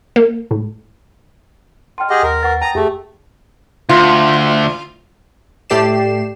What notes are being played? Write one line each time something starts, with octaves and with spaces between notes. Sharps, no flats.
A#3
A2
D#5 G5 A5 C6 F6
G4 G#4 D#5 F#5 A#5
D#2 A#4
B4 F#5 C#6 A6
G5 A5 A#5 D#6
F2 A3 G4 G#4
D2 F4
A2 A3 G4 D5 C7 E7